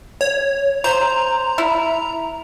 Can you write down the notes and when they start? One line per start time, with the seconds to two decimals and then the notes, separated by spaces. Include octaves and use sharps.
0.21 C#5
0.84 C5 A#5
1.58 E4